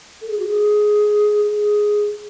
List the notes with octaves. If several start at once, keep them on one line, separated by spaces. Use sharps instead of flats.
A4
G#4
F#4
G#4
G#4